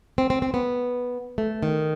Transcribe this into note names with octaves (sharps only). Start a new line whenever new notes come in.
C4
C4
C4
B3
A3
D#3